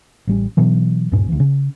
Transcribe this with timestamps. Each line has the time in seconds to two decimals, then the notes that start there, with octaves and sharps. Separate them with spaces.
0.27 A1 G3 C#4
0.57 B2 E3 F#3
1.12 D1 G2 A#2 C#4
1.29 D2 E3
1.40 C#3